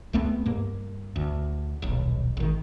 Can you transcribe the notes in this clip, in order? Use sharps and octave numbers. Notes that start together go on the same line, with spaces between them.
C#2 A3 B3 C4
G2 A#3
D2
D#1 B1
G#1 D#3